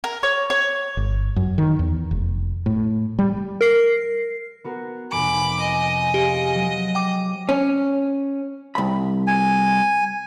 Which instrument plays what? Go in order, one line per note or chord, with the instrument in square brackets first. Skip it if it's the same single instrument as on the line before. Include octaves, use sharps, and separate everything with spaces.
[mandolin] A#4
C#5
C#5
[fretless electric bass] G1
F#2
D#3
E2
F1
A2
G3
[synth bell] A#4 C7
[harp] B3 F#4 A#4
[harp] F1 F2 C3 [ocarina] G#5 [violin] B5 D6
[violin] D#5
[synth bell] G4 [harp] G#4 C5 F5
[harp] F#3 G#3
[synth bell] G5 D6 [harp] D#6
[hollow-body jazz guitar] C#4
C2 B5
[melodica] G#5